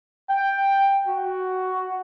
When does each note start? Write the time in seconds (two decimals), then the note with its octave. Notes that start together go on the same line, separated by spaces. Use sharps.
0.30 G5
1.07 F#4